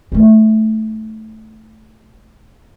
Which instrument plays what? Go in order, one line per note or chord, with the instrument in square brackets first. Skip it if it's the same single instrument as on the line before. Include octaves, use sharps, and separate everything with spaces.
[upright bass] A3 D#4